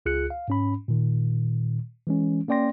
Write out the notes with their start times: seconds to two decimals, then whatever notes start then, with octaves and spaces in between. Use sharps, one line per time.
0.06 C#2 F4 G#4 F#6 C#7
0.30 F5
0.48 G#2 C#4 B5
0.88 A#2 D#3
2.07 E3 G#3 C#4
2.48 A#3 C#4 D5 G5 C6 A#6